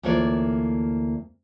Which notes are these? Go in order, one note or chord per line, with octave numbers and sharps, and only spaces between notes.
D2 E3 A#3 F4 C#5 D5